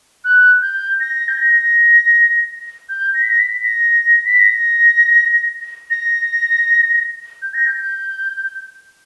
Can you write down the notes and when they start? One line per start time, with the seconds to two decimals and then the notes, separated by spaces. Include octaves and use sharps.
0.24 F#6
0.62 G6
1.00 A#6
1.28 G6
1.38 A#6
2.89 G6
3.14 A#6
3.22 B6
3.30 A#6
3.39 B6
3.64 A#6
4.25 B6
4.39 A#6
5.90 A#6
7.42 G6
7.54 A#6
7.66 G6